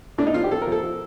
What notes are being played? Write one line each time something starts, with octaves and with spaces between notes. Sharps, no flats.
A2 D4
D#4
F3 F4
G4
F3 A4
A#4
F3 A4
F3